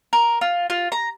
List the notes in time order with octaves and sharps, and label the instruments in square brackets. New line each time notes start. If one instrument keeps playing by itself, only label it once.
[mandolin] A#4
F4
F4
A#5